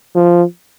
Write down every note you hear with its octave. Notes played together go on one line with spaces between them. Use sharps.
F3